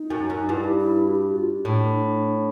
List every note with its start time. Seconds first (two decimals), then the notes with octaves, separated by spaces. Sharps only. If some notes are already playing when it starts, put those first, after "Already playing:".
Already playing: D#4
0.10 F#2
0.30 F#2
0.49 G2 E4
0.56 D#4
0.64 E4
0.79 E4
1.07 F#4
1.15 G4
1.22 F#4
1.36 F4
1.50 D4
1.65 A2